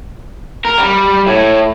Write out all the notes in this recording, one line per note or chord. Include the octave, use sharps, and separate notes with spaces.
A#4
G3
A2